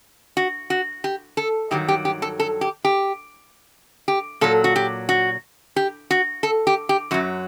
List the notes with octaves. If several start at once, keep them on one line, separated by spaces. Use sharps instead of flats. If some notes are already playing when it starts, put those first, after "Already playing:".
F#4
F#4
G4
A4
G2 D#3 F#3 G4
G4
G4
A4
A4
G4
G4
G4
A#2 F#3 A4
F#4
G4
F#4
G4
F#4
A4
G4
G4
F#2 F#3 F#4